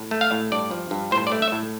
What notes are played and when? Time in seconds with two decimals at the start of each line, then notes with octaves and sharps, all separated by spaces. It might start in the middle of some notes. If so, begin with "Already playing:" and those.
Already playing: A2
0.11 A3
0.21 F5
0.32 A2
0.52 G2 D5
0.71 F3
0.91 G2
1.11 A2 C5
1.27 D5
1.32 A3
1.42 E5
1.52 A2